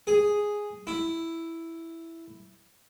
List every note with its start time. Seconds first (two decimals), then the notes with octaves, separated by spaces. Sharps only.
0.07 G#4
0.87 E4